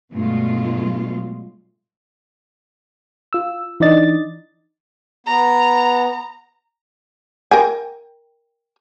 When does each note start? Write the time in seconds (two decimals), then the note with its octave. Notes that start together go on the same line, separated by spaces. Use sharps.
0.12 G2 B2 F#3 G#3 A3 F4
3.33 F4 E6
3.80 E3 D4 D#4 D5 D#5 A6
5.27 B3 A#5
7.51 A#4 G5 G#5